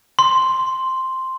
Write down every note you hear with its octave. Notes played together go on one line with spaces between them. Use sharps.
C6